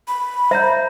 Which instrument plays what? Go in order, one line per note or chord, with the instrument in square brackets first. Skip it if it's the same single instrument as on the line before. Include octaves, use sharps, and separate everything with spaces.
[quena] B5
[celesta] C5 G6 [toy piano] E5 A#5